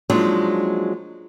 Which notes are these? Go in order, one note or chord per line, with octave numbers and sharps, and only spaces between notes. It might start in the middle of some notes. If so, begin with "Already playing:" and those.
F3 F#3 G#3 A#3 D4 D#4